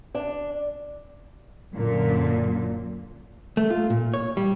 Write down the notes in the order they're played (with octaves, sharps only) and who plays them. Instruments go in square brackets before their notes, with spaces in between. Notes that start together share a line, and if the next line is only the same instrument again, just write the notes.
[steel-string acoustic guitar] D4
[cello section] F#2 A#2 D3
[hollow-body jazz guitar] A3
F4
A#2
C#5
G3